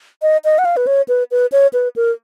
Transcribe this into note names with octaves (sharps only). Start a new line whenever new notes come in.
D#5
D#5
F#5
F5
B4
C#5
B4
B4
C#5
B4
A#4